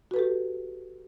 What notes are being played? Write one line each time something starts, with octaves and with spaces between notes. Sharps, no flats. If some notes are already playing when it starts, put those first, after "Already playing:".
F#4 G4 A4 B4